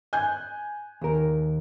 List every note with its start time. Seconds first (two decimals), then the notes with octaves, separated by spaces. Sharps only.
0.13 G#5 F#6 G6
1.02 D#2 A#4